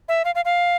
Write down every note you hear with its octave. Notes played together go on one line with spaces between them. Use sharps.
E5
F5
F5
F5